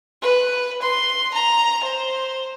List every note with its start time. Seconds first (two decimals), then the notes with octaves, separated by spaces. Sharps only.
0.22 B4
0.82 C6
1.34 A#5
1.83 C5